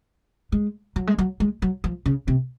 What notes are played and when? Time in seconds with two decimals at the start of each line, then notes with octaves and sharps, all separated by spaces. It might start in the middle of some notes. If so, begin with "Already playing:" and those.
0.52 G#3
0.96 F#3
1.07 G#3
1.18 F#3
1.40 G#3
1.62 F#3
1.84 F3
2.06 C#3
2.28 C3